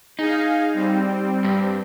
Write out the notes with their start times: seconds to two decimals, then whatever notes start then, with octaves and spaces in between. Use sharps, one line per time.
0.19 D#4 G#4 F5
0.74 G3 C4
1.44 G2